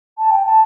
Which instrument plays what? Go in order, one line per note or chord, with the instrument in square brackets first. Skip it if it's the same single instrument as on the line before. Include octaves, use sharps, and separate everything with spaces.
[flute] A5
G5
A5